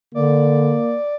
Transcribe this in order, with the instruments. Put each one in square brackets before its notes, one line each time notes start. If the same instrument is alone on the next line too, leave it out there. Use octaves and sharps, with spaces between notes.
[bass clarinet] D3 [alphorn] A#3 [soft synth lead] D5